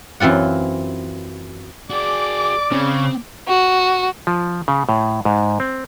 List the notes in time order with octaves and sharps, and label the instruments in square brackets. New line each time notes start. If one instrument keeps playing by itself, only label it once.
[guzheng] F#2 E3 C4 F4 F#5
[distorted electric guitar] F#4 G#4 [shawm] D5 [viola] D6
[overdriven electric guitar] C#3 [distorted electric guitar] C4
[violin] F#4
[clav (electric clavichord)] F3
C#3
A2
G#2
C4